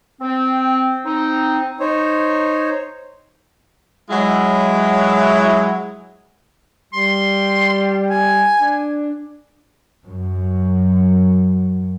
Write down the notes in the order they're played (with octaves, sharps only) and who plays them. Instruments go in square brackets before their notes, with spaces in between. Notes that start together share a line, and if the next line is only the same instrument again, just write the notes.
[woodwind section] C4
C4 D#4
[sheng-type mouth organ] D#4 C5 C#5
[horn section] F#3 G#3 E4
[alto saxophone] G3 [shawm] C6
[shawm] G#5
[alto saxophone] D4
[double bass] F#2 F#3